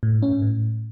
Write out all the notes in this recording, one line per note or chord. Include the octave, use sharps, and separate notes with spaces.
A2
G#2
C#4
G#2
A2